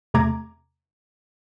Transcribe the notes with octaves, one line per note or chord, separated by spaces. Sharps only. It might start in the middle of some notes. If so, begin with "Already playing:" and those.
E2 C3 A3 A#5 D6 G#6